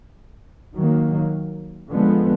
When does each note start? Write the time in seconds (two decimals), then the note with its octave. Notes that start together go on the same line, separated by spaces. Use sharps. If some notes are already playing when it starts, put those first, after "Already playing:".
0.76 D#3 F#3 A#3
1.90 D3 F3 G#3 B3